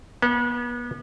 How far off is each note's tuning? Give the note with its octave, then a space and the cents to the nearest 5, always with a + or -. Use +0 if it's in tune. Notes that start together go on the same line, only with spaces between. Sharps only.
B3 -35